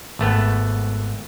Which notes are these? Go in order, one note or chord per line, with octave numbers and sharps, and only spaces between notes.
G#1 A3 B3